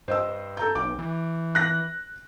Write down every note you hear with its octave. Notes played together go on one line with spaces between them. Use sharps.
G2 C5 D#5 E6
A4 A#5 G6
B1 D6
E3
F#6 A#6